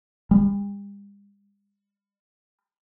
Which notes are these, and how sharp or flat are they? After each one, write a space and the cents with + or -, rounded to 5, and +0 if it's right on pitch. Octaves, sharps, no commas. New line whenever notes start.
G3 +45